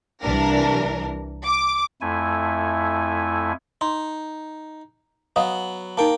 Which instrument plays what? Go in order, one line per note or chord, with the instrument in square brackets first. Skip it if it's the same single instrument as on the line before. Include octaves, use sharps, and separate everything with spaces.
[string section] C2 E3 D4 A#4
D6
[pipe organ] F2 A3 E4 G#5
[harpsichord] D#4 [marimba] C6
[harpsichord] F#3 B3 [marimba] D#5 F5 D#6
[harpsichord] A#3 G5 [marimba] D#4 A#4 A5